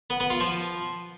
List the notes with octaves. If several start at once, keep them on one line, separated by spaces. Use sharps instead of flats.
B3
B3
F4
F3